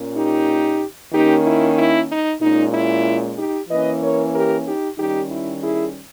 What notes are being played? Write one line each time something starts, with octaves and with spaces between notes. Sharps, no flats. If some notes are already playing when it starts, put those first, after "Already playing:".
Already playing: A#2 A#3 C#4
D#4 G4
D#3 A#3 C#4 D#4 G4
E4
E4
D#4
A#2 G#3 C#4 D#4
E4
D#4 G4
E3 A#3 C#4 B4 D#5
A#4 C#5
G4 A#4
D#4 G4
D#3 G3 C#4 D#4 G4
E4
E4 G#4